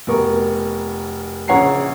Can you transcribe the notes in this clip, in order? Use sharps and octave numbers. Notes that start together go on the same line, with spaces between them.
F1 B2 A#4 C#6
A#1 C#3 C#5 F#5 A#5 C7